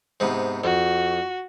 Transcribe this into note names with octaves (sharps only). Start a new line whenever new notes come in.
G#2 C3 B3
F2 F#4